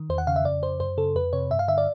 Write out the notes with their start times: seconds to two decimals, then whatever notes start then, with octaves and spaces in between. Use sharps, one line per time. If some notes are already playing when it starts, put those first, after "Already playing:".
Already playing: D#3
0.10 E2 C5
0.18 F#5
0.27 C#3 F5
0.36 E5
0.44 F2 D5
0.62 C#3 C5
0.80 F#2 C5
0.98 C#3 A4
1.16 F2 B4
1.33 C3 C#5
1.51 G2 E5
1.59 F5
1.68 D3 E5
1.78 D5